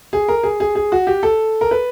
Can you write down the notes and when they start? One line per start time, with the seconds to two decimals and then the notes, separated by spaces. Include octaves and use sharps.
0.13 G#4
0.28 A#4
0.43 G#4
0.60 G#4
0.75 G#4
0.92 F#4
1.07 G4
1.23 A4
1.61 A#4
1.71 B4